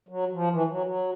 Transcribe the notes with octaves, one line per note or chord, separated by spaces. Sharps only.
F#3
F3
E3
F#3
F#3